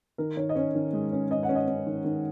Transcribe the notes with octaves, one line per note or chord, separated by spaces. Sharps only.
D#3 A#4
D#3 C#5
D#5
C#4 C#5
D#3
G#3
C#4
C#4 D#5
F#5
C#4
D#5
C#4
D#3
D#3